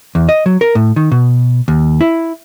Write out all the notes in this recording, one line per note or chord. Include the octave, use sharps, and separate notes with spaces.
E2
D#5
F#3
A#4
A2
D#3
B2
D#2
E4